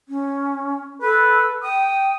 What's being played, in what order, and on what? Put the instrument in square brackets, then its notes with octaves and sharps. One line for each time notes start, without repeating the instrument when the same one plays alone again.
[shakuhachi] C#4
[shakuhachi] A4 [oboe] B4
[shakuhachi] G5 [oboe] D#6